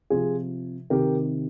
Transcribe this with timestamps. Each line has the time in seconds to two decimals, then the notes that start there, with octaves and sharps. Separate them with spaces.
0.10 C3 F3 F4 G#4
0.90 C3 D#3 G4 A#4